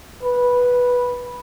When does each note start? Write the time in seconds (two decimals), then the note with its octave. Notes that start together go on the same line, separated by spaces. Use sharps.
0.23 B4